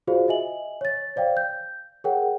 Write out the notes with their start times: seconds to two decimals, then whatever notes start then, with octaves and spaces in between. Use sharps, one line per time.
0.07 F4 F#4 G#4 C5 D5 F5
0.28 D#5 E5 G#5 F#7
0.81 C#5 A6
1.16 C5 D5 F5 G5
1.37 G6
2.04 G#4 A#4 C#5 F#5 G5